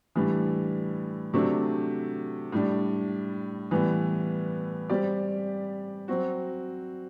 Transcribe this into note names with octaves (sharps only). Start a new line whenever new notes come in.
A2 E3 G3 D4
C3 F#3 A3 D4
A2 G3 D4
A2 E3 G3 B3
G3 C4 G4 D5
F#3 C4 F#4